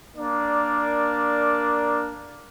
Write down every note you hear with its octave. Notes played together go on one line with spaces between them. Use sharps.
A#3 D4 A#4 D5